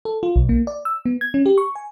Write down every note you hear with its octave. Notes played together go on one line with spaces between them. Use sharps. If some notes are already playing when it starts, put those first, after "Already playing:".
A4
F4
B1
A#3
D5
E6
B3
G#6
C#4
G4
C#6
G#5